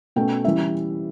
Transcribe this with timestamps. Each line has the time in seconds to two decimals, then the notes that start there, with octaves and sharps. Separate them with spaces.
0.16 B2 A3 C#4 G5
0.44 E3 G3 C#4 E5